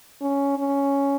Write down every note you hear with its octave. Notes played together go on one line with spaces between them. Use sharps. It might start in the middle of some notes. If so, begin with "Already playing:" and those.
C#4
C#4